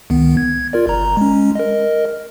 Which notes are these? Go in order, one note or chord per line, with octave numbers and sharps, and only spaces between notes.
C#2 D#3 B3
G#6
F4 A#4 D5
G1 A#5
G#3 C#4
A#4 D#5